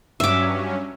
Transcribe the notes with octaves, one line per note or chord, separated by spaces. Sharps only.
G2 F#3 C#4 E5 D6